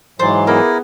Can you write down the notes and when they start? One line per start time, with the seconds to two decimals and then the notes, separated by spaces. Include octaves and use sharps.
0.19 G#2 E3 F#3 C5 D5
0.47 A#3 B3 E4 G#4 A#4